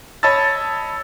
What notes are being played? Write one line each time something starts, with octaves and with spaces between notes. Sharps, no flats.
C#5 D#5 A5 B5 E6 A6